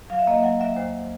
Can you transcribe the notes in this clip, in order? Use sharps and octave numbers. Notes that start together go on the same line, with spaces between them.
F#3 F5
E5
A#3 D#5
E5
F#3 F#5
F#3 E5
D#2 C5